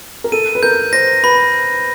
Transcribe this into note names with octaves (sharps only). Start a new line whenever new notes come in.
A#4
A4 D#7
B4
A#4 G6
C5 A#6
B4 B5